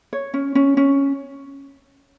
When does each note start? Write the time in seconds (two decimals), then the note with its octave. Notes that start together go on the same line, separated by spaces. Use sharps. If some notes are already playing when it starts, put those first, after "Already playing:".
0.13 C#5
0.34 C#4
0.55 C#4
0.77 C#4